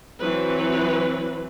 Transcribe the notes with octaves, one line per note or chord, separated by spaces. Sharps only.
E3 F#3 C4 B4